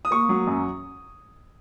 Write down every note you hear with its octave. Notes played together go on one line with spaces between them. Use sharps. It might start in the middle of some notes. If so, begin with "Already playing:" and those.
D#6
A#3 C#6
F#3
F#2